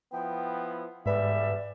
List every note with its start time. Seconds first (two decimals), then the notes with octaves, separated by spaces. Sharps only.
0.12 F3 B3 E4 G5
1.06 E2 G#2 D3 G3 B4 D5 E5